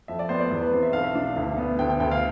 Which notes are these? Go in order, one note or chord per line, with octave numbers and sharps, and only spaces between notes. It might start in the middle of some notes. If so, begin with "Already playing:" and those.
F2 E5
D5
B3 C5
D5
E2
B4
C4 C5
E5
B1 F5
E5
D4
D2
B3
D2 G5
G5
D2 G5
F5